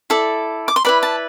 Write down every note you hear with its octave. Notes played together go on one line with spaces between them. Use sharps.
E4 A4 D5
D6
C6
E4 B4 D5 B5
A5